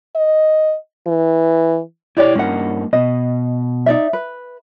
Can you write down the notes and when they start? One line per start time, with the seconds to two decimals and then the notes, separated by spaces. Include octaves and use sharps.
0.15 D#5
1.07 E3
2.17 E4 G4 C#5 D5 G5
2.36 G2 A#3 C#4 D#4 F#5
2.93 B2 D#5
3.86 D#4 D5 E5
4.13 B4